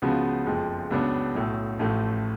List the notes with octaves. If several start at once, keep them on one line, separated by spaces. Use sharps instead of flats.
C#2 C#3 F3 B3 F#4
F#1 F2 F3 G#3
C#2 C#3 F#3 B3 D4
B1 A2 F#3
A1 A2 F3 A3